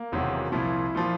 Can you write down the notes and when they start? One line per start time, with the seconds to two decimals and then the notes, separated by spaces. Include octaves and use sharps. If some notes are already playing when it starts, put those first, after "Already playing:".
Already playing: A#3
0.12 E1 E2 C3 D#3 F#3
0.52 C2 A#2 F3 E4
0.95 A#2 F3